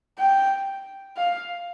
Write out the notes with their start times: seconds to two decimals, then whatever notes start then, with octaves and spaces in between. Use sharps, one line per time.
0.19 G5
1.17 F5